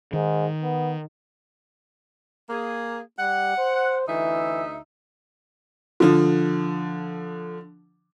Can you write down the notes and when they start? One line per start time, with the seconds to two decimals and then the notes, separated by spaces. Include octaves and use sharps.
0.13 G#2 D#3
0.63 B3
2.50 A#3 G#4
3.19 G3 F#5
3.58 C5
4.08 D2 E3 D#4 E5
6.00 D3 F3